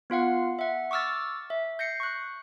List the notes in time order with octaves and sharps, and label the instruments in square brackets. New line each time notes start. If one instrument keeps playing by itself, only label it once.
[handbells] B3 F4 F5 F#5
E5 F#5
C#6 D6 E6 F6 A6
E5
G6 A#6 C7 C#7
C#6 F#6